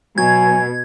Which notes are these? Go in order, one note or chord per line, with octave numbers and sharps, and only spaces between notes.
B2 F#3 G#5 G#6